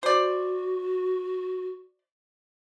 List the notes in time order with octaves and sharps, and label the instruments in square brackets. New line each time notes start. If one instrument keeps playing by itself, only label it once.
[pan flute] F#4 [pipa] C5 D5